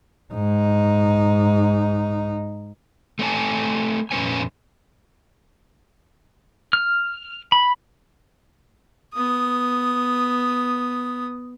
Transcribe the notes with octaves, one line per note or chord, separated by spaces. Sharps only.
G#2 D#4
A3 C4 C#5 G#5 A5
F2 A#2 C#4 B4 C#5 G#5
F6
B5
B3 D#6